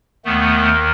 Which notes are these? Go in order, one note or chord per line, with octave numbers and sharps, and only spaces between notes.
D#2 D#3 A3 B3